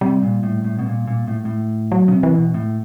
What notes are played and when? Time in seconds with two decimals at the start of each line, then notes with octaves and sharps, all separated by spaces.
0.01 C3 G3
0.23 A#2
0.43 A2
0.64 A2
0.79 B2
0.86 A#2
1.07 A#2
1.27 A2
1.45 A2
1.92 F#3
2.08 C#3
2.12 C3
2.23 E3
2.34 B2
2.54 A2